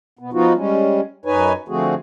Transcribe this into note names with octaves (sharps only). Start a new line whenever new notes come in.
B2 B3
F3 B3 D#4 F4 F#4
G3 G#3 C#4
F#2 D#4 B4 C#5 G#5
D3 F3 A3 C4 F#4 G#4